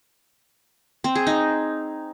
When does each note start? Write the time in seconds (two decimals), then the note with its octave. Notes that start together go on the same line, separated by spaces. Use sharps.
1.04 C4
1.15 G#4
1.27 D#4